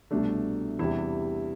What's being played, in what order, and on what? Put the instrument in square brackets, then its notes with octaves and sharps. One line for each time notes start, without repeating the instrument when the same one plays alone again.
[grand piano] C2 B2 A3 D4
E2 C3 G3 E4